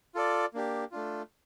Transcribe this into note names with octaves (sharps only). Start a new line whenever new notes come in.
F4 A4 D5
A#3 D4 G4
A3 D4 F4